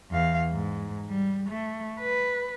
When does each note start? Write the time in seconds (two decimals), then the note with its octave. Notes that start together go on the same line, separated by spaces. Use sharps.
0.11 E2 F5
0.52 G#2
1.09 G3
1.50 A3
2.00 B4